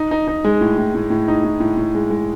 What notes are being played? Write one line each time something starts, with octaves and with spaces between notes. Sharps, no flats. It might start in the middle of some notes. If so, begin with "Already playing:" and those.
Already playing: D#4
D#4
D#4
G#3
A2
A2
A2
A2
D#4
A2
A2
A2
G#3
G#3